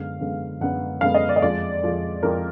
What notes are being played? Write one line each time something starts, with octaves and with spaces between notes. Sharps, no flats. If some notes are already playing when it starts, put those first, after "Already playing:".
Already playing: F#2 D3 G#3 B3 F5
F#2 D3 G#3 B3
F#2 D3 G#3 B3 F#5
F#2 D3 G#3 B3 F5
D#5
D5
D#5
F2 F3 G#3 D5
F2 F3 G#3
F2 F3 G#3 A#4